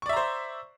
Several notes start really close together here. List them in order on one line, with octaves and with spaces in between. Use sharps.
C#6 D5 E5 A#5 C5